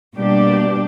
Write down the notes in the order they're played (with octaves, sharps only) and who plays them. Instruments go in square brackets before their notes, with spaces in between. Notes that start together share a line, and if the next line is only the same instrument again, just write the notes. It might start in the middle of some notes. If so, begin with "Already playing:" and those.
[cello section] B2 G3 A#3 D4 G4